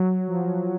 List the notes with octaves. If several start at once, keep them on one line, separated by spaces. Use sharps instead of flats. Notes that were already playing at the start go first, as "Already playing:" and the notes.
Already playing: F#3
F3